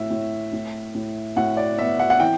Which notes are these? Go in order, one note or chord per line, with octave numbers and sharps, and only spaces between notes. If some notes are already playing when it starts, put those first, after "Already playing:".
Already playing: A2 E5
A2
A2
A2
A2 F#5
D5
B3 E5
F#5
F#5
E3 G5